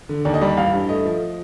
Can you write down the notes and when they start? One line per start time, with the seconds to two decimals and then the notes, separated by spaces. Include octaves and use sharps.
0.09 D3
0.25 D#2 D5
0.34 D#5
0.41 G3 D5
0.57 A1 F5
0.73 G2
0.89 A3 D#5
1.05 F3